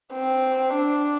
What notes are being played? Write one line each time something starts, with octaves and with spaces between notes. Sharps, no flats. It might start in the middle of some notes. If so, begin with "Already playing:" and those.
C4
D4